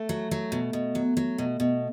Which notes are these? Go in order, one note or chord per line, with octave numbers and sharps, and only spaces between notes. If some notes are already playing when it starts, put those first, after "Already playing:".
Already playing: A3
F#3
F#3
B2
B2
F#3
F#3
B2
B2